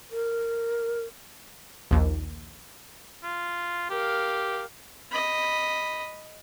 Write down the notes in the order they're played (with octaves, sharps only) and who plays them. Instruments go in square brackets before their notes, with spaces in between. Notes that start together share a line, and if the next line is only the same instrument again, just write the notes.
[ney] A#4
[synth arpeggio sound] A#1 D#2
[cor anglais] F4
[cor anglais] G4 [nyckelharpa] A#4 F5
[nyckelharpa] D#5 B5